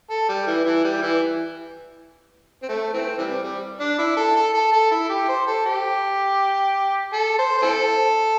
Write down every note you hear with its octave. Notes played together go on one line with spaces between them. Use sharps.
A4
G3
E3
E3
G3
E3
C4
A3
E3 A3 C4
C3 E3 G3
G3
D4
E4
A4
A4
A4
A4
E4
G4
C5
A4
G4
A4
C5
C5
C4 E4 A4